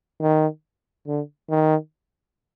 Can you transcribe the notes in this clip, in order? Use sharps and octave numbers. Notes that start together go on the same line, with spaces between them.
D#3
D3
D#3